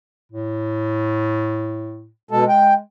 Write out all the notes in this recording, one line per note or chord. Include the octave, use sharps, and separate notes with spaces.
A2
B2 G#3 A4
G5